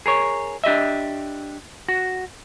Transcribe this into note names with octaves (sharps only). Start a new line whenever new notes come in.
G#4 A#4 C#5
D4 G4 D#5 E5
F#4